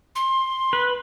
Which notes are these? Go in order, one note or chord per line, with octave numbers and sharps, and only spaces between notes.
C6
B4